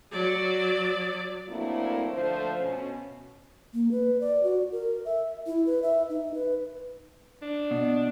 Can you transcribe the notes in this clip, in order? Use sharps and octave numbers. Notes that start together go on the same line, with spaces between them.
F#3 D5
F#3 A3 A#3 C4 D4 E4
D3 F3 A3 C5
B2 C#4
A#3
B4
D5
F#4
A#4
E5
E4
B4
E5
D#4
B4
D4
B2